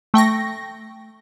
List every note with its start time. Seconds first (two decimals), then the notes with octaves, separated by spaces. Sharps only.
0.14 A3 G5 C#6 A#6